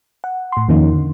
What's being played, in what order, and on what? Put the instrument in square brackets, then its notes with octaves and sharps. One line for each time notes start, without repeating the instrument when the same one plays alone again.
[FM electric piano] F#5
A2 C6
E2 D#3 F3 A#3 C#4 D#4
D3